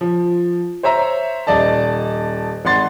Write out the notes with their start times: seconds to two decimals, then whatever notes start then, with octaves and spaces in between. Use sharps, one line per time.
0.01 F3
0.83 C5 C#5 E5 A#5
1.47 D#1 D5 D#5 A5
2.65 G#1 G#3 F#5 C6 A6